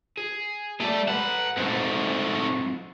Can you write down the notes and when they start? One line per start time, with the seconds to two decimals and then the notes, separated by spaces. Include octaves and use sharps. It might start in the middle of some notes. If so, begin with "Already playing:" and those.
0.17 G#4
0.80 A3 G4 D5
1.08 A4 B4 F#5
1.57 G#2 F#3 A3 C4